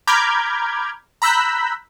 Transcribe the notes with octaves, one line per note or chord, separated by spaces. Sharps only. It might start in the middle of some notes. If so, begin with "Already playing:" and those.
A#5 B5 D6 F6 G6 G#6
A#5 B5 E6 F#6 G6 B6